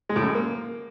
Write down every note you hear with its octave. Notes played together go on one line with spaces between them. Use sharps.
G#3
A2
F#2
G#3
A#3